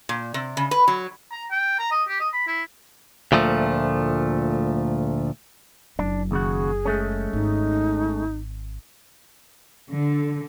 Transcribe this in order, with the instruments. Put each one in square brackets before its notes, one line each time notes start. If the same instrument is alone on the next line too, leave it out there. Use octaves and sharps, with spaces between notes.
[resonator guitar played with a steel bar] A#2
C3
C#3
B4
F#3
[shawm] A#5
G5
A#5
D#5
G4
D#5
B5
E4
[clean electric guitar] D2 A#2 F3 A3
[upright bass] F#1 F#3 [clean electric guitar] D4
[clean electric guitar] D#2 C#3 F#4 [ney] G#4
[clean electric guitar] G#3 A3 C#4
[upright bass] G#1 [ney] D#4
[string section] D3